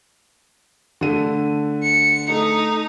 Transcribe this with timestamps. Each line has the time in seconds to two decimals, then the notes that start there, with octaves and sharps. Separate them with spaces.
1.01 D3 A3 D#7
1.83 C#7
2.30 A3 D#4